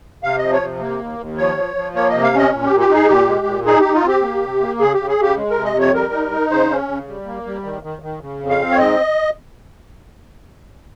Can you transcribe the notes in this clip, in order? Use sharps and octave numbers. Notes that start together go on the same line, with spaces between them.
C3 F5
F3 D#5
C#5
C3
A#3
D#2
D#2
F3 C#5
F3
F3
A#3 C#5
C3 D#5
F5
C#4 D#5
A#2
A#2 G4
G4
D#4 G#4
A#2 G4
G#3
A#2
D#4 G#4
D#4 G4
F4
C4 G4
A#3
C3
A#3
C#3 G#4
C#3 G4
G#4
C#3 G4
G#3
C3 A#4
D#5
F2 C#5
G3 A#4
D#4
D#4
C#3 C5
C#4
C#3
G3
A#3
G3
D#3
D#3
D#3
C#3
F2
F5
C4
C#5
G#2 D#5